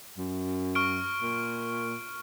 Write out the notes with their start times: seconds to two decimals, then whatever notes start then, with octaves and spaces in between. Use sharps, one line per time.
0.17 F#2
0.75 C#6 F6 D7
1.22 A#2